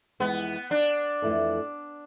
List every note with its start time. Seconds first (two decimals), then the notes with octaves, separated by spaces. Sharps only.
0.20 F2 E3 G#3 B3
0.71 D4
1.22 F2 E3 A3 E4 A4